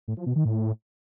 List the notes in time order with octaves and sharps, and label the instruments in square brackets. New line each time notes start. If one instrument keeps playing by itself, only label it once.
[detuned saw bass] A2
F3
B2
D#3
A2